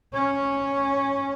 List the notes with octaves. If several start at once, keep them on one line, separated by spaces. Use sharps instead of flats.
C#4